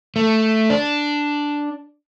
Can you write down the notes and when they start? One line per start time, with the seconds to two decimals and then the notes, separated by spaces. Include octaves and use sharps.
0.16 A3
0.70 D4